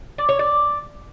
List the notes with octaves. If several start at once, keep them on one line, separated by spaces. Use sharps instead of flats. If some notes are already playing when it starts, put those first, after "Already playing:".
D5
C#5
D5